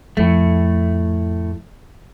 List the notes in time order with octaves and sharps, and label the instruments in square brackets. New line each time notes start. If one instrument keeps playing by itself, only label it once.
[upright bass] F2 [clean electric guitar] A2 A3